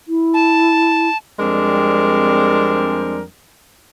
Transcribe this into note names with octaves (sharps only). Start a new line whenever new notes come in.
E4
A5
F2 G3 G#3 C4 D4 A#4